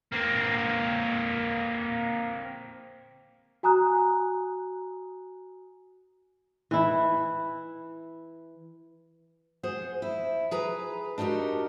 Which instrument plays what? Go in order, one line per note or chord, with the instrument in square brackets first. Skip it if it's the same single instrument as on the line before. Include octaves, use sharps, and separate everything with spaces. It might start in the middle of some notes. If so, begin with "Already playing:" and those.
[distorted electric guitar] A#3 C4
[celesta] F#4 G#5 A#5 D#6 F#6
[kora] E3 E4
[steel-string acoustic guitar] G#4 C5 F#5
E4
G#4 B4 A#5
D4 D#4 F#4 G4 A#4